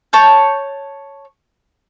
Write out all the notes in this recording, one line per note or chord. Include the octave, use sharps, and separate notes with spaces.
C#5 A5 G6